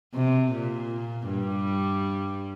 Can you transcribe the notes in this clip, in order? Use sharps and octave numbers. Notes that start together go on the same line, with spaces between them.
C3
A#2
G2 G3